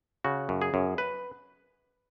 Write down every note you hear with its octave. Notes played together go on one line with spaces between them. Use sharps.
C#3 F#4
F#2
G#4
F#2
B4